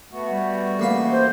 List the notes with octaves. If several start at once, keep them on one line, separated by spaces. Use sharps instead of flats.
A3 B3 F#4
G3
A1 A#3 F5
C5